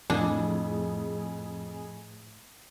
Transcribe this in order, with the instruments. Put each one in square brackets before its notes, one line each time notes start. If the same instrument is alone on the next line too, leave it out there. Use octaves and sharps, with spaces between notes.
[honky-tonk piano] F2 [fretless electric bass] A2 [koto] D4 [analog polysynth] G#4